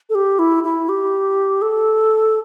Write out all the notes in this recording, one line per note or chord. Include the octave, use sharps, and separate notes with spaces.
A4
G4
E4
E4
G4
A4